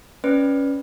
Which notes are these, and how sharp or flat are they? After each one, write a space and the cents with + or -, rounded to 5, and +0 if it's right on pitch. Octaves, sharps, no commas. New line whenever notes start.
C#4 +0 B4 +0 D5 +0